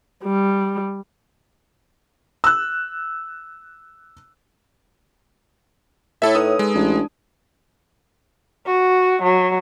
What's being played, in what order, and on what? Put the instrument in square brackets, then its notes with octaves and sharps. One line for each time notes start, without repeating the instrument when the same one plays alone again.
[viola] G3
[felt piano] E6 F#6
[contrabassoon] A2 [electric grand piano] E4 A4 E5 [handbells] C#5
[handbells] D#4 A4 B4 [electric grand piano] D#6
[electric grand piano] G#3
[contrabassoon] A1 [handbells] D4
[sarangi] F#4
F#3